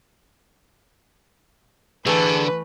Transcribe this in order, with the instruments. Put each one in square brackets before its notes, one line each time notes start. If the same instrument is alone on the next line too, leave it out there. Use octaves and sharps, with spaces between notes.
[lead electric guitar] D3 [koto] E3 A3 [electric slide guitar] G#4 A5 [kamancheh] B4